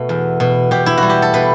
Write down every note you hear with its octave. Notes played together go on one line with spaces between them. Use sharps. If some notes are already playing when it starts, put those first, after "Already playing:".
Already playing: B2 A3
E2
B2
B2 G4
E4
G3 F#4
G4
A4
B2 B4